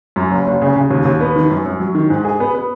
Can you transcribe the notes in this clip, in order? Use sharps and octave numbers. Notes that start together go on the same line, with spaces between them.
F#2
F#1
F#1
C#3
C#3
D#2
D#2
B3
D#3
F#2
F#2
F#3
D#3
G#2
G#4
B3
B3